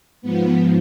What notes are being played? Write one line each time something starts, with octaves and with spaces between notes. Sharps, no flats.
G#2 F3 B3